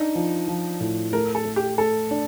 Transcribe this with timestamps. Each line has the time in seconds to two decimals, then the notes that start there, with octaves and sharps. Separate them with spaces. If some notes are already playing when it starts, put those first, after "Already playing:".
Already playing: D4 D#4
0.15 F3
0.48 F3
0.81 A2
1.13 A3 A#4
1.35 A4
1.45 A3
1.56 G4
1.78 A3 A4
2.11 D4